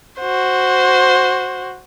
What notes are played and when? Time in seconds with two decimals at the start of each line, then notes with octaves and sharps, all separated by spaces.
0.20 F#4 C5